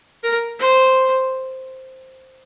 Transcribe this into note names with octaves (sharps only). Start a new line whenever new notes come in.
A#4
C5